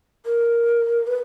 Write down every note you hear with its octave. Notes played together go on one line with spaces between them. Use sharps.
A#4
B4